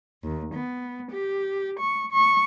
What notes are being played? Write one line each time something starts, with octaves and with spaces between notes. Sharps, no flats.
D#2
B3
G4
C#6
C#6